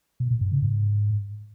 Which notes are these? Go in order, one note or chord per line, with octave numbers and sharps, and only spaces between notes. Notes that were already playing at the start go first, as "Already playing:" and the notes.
B2
A#2
G2
C#3
G#2